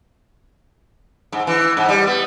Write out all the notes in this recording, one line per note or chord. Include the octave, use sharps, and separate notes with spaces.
G#2
E3
G#2
G3
B3